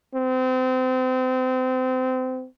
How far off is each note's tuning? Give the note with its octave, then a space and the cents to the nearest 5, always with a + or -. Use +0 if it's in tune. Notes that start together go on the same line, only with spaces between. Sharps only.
C4 -30